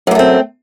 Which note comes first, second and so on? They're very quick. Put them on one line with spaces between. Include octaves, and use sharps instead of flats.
F#2 A#3 A3 C4